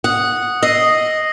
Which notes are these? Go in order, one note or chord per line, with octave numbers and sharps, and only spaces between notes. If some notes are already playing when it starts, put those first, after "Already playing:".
F#5 D#6
D#5 E6 A#6 C7